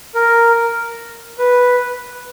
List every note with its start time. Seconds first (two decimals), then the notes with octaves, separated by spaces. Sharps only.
0.15 A#4
1.39 B4